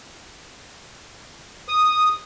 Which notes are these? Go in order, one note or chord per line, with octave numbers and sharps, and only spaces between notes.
D#6